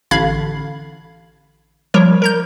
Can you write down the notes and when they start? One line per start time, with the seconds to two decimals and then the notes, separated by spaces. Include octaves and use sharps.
0.11 A1 D3 F5 B5 G#6
1.94 F3 G3 A#4 C#5
2.22 A#4 A#5 G6